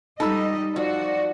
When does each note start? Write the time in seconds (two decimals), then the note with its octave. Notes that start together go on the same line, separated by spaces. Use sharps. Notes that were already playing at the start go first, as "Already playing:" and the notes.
0.20 G3 D#4 A4 D#5 B5 E6
0.76 F3 F#4 D5